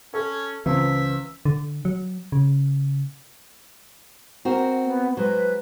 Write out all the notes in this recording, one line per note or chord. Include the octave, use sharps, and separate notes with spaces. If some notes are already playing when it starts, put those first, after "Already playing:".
C#4 A4
C#2 E3 C5 E5 A5
D3
F#3
C#3
C4 F#4 A#4
B3
F#3 G#3 B4 C5